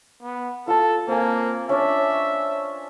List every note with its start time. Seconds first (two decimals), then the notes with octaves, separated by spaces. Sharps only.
0.23 B3
0.67 F4 A4 A5
1.08 A#3 C4 G#5
1.69 C#4 D4 D5 E5